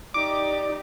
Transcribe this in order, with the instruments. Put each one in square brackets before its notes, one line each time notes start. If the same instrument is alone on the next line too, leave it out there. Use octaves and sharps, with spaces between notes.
[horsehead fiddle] D#4 G4 [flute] D5 [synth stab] D6